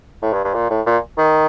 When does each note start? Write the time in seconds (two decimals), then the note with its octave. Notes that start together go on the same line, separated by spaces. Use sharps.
0.22 A2
0.33 G2
0.44 G2
0.54 A#2
0.70 A2
0.86 A#2
1.18 D#3